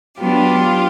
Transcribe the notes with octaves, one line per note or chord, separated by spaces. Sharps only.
F#3 B3 D4 F4 G4